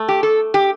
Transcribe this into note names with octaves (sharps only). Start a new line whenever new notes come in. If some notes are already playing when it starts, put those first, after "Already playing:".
Already playing: A3
G4
A4
G4